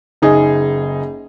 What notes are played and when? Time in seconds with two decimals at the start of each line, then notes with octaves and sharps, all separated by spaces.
0.22 F#1 D#4 G#4